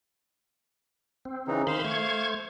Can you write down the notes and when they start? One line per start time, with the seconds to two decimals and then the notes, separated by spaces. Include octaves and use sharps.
1.25 C4
1.48 C#3 E3 D#4
1.67 D#3 C5 F5 B5 C6
1.84 A3 C#6 G#6